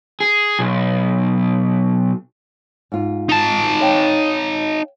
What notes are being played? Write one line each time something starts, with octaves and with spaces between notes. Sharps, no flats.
G#4
B1
G#2 F4
D#4 A5
C#5 F5 G5